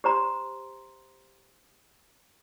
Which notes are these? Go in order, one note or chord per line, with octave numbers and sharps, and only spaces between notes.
G4 C5 A#5 C6